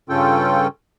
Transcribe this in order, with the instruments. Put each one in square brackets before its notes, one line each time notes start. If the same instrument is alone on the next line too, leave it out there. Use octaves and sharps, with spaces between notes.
[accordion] G2 C#3 C#4 F4 A4 G5